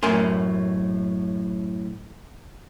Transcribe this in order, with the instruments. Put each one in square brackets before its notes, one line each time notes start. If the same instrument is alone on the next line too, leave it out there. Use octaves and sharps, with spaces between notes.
[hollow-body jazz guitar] F#2 A2 A#4 G#5 C6